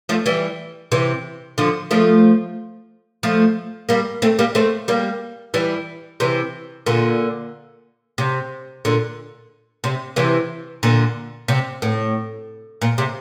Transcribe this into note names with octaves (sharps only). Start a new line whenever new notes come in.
F3 A3
E3 G3
C3 E3
D3 F3
F3 A3
F3 A3
G3 A#3
A3 C4
G3 A#3
A3 C4
G3 A#3
E3 G3
C3 E3
A#2 D3
C3
A#2 D3
C3
C3 E3
A#2 D3
C3
A2
A#2
C3